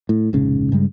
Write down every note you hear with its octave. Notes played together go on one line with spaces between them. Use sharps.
A2
F1 A#1 G#2 C#3
G2 C#3 G3 G#3